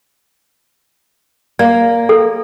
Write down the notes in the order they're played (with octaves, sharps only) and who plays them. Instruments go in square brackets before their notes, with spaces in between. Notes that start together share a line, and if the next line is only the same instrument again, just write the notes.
[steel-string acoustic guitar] A#3 [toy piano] D5
[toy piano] A4